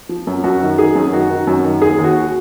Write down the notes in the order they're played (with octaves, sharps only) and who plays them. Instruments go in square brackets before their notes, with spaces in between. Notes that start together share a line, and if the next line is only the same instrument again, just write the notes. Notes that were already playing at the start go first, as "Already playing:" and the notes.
[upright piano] F3
F#2
F#2 F#4
D#3
D#3 G#4
F#2
D#3 F#4
D#3
F#2
D#3
D#2 G#4
D#2
F#4